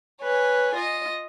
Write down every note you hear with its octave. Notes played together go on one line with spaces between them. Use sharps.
B4 C#5 G#5
F4 D#5